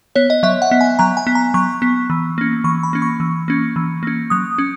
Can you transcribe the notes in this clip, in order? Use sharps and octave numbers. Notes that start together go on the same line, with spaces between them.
B3 C#5
D#5
F#3 E5
F#5
B3
G#5
F#3 A#5
G#5
B3
A#5
F#3 C#6
B3
E3
A#3 C#4
E3 C#6
B5
A#3 C#4
C#6
E3
A#3 C#4
E3
A#3 C#4
F#3 D#6
C#4